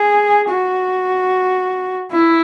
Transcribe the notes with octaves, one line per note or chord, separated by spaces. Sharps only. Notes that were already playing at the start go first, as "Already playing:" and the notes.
Already playing: G#4
F#4
E4